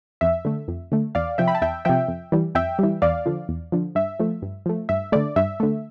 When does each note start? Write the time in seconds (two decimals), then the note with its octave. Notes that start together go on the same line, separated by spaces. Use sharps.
0.21 F2 E5
0.45 D3 A3
0.68 F2
0.92 D3 A3
1.15 E2 D5 F5
1.38 C3 F3 E5 G5
1.48 B5
1.55 A5
1.62 E2 E5 G5
1.85 C3 F3 E5 G5
2.08 F2
2.32 E3 G3
2.55 F2 E5 G5
2.79 E3 G3
3.02 E2 D5 F5
3.26 D3 F3
3.49 E2
3.72 D3 F3
3.95 G2 E5
4.19 F3 A3
4.42 G2
4.66 F3 A3
4.89 G2 E5
5.12 D3 A3 D5
5.36 G2 E5
5.60 D3 A3